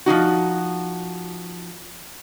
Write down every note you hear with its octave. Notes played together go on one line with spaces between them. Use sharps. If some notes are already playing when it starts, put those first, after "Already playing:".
F3 C#4 D#4 F#4